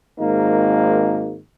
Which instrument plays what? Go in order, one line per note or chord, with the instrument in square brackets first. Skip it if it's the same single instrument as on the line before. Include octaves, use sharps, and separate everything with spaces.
[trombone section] G#1 G#2 A#3 D#4